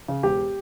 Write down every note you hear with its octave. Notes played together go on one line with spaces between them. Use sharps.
C#3
E1 G4